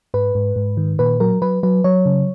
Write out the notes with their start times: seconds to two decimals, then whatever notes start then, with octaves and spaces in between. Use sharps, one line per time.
0.14 G#2 B4
0.35 G#2
0.56 G#2
0.77 D#3
0.99 A#2 B4
1.20 F#3 A#4
1.42 F#3 B4
1.63 F#3 B4
1.84 F#3 C#5
2.06 C#3